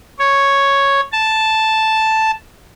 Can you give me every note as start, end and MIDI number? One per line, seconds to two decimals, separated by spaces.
0.19 1.00 73
1.12 2.31 81